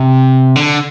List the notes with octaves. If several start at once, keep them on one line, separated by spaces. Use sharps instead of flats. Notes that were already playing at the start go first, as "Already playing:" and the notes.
Already playing: C3
D3